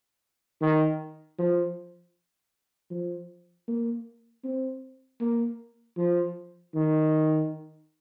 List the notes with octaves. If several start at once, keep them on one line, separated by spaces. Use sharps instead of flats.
D#3
F3
F3
A#3
C4
A#3
F3
D#3